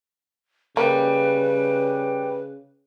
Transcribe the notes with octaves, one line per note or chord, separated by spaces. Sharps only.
C#3 G3 A#3 B4